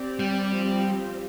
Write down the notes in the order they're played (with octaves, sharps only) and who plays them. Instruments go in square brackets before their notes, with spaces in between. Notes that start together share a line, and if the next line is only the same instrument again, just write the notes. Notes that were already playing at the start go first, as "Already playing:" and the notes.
Already playing: [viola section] C4 G4 D5
[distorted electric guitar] G3
[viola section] F3 C4 G4